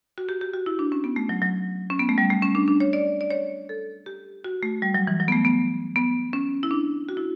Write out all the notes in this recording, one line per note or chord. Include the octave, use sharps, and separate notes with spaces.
F#4
G4
G4
F#4
E4
D4
C#4
B3
A3
F#3
F#3
C#4
B3
A3
G3
A3
C#4
D4
D4
C#5
D5
D5
C#5
A4
G4
F#4
A3
G3
F#3
E3
F#3
B3
A3
B3
B3
C#4
E4
D4
F#4
E4